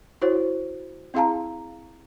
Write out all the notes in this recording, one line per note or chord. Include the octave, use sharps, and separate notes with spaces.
E4 F#4 C5 C#5
C4 E4 G#4 F5 A5 A#5